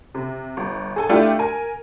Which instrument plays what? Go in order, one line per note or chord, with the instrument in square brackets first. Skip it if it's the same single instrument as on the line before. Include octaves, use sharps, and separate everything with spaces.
[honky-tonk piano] C3
G1
G#4 A4 G#5
A3 D4 E4 F4 G4 A4
A#4 G#5